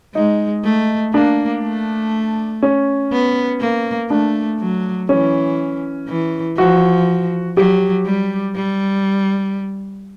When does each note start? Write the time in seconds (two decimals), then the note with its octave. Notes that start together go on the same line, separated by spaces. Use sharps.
0.15 G#3 D#4
0.64 A3
1.14 A#3 D4
1.63 A3
2.63 C#4
3.12 B3
3.60 A#3
4.10 A3 D4
4.60 F#3
5.09 E3 C#4
6.09 E3
6.57 F3 F#4
7.57 F#3 G4
8.05 G3
8.55 G3